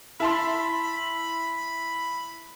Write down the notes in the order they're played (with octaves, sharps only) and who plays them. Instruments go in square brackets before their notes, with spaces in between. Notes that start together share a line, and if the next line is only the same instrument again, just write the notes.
[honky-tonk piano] E4 A5 C6 [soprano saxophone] B5